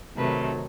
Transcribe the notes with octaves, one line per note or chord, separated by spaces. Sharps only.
C3 D#3 F#3 A3 B4